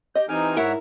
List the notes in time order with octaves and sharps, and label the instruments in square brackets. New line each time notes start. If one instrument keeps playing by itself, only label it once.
[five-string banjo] G4 D#5 [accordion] G6
[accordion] E3 C4 D#4 [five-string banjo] G4 [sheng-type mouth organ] G#5 F6
[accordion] G#2 [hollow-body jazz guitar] E4 A#4 [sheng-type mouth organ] C#5 E5 F#5